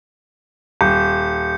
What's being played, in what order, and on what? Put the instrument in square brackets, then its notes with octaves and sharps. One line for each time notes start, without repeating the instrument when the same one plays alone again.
[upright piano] D#1 [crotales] G6 C#7